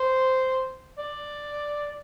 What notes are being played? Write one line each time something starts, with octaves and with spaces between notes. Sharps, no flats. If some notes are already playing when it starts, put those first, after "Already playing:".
Already playing: C5
D5